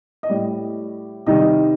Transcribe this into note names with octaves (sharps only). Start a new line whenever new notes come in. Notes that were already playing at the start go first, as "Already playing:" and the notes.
D#5
A2 G3 D5
C3 D#3 G3 D#5